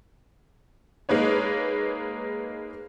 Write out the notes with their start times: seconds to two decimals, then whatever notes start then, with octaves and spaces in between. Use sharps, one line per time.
1.09 G#3 A#3 D#4 B4 C#5